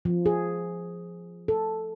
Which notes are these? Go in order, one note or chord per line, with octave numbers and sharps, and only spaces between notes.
F3
G#4
A4